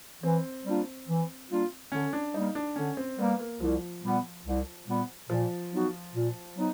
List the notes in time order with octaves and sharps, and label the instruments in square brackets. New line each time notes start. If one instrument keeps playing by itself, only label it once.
[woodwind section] E3 [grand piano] C4
[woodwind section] G3 A#3 D4 F4
E3
G3 A#3 D4 F4
[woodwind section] D3 [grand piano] C#4
[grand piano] D4
[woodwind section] G3 A#3 [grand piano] D#4
[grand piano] D4
[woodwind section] D3 [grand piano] C#4
[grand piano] C4
[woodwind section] G3 A#3 [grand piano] B3
[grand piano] A#3
[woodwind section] C2 [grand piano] F3
[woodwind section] A#2 G3 B3
C2
A#2 G3 B3
[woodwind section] A#2 [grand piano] F3
[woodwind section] F#3 B3 D#4 F#4
A#2
F#3 B3 D#4